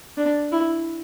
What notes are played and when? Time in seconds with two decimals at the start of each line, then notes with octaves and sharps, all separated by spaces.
0.17 D4
0.52 E4